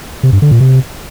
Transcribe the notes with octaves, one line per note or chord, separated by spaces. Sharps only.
C3
G2
D3
A#2
C3